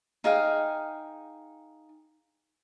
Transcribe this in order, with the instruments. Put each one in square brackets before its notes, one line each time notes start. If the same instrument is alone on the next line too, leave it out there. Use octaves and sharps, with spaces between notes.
[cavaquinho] D#4 G#4 F5 G5